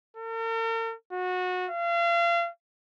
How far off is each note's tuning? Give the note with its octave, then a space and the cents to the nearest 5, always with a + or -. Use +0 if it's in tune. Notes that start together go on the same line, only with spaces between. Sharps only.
A#4 -45
F#4 -25
F5 -35